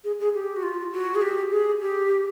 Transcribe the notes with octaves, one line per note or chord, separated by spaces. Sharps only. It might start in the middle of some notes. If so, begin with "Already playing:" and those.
G#4
G#4
G4
F#4
F4
F#4
G#4
G4
G#4
G4